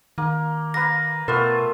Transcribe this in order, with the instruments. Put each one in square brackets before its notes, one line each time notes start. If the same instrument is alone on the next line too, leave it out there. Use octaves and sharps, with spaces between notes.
[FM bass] D#3 [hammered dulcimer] A#3
[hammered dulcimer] A#3 B4 [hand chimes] A#6
[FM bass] B2 [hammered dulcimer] A3 B3 F4 [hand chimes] A#4